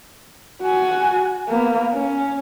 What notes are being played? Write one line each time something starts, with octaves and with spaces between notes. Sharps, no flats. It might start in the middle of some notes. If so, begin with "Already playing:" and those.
F#4 G#5
A#3 B3
C#4